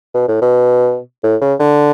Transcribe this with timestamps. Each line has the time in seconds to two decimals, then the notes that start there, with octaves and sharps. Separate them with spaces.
0.14 B2
0.28 A2
0.42 B2
1.23 A2
1.42 C#3
1.60 D3